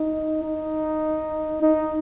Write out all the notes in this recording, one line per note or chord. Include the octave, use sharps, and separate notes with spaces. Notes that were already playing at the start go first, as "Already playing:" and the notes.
Already playing: D#4
D#4
D#4